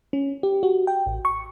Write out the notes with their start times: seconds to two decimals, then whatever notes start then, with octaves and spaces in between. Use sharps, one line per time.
0.13 C#4
0.43 G4
0.63 F#4
0.87 G5
1.06 A1
1.25 C#6